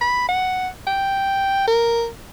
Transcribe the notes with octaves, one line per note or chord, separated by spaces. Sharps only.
B5
F#5
G5
A#4